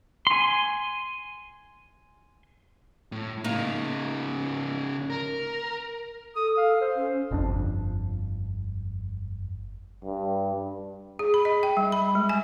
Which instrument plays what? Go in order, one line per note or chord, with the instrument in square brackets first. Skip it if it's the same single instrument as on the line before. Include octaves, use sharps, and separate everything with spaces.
[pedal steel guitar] G#5 C6
[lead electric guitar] A2
[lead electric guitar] C#3 D#4 [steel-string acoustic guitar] A#3 A#5
[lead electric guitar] A#4
[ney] A4 [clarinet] D#6
[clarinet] F5
C5
[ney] C#4
[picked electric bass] G1 F2 D4
[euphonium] G2
[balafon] G#4
B5
D#5
G5
G3
B5
G#3
G#5